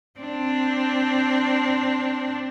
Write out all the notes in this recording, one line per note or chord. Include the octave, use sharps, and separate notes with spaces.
C4 D4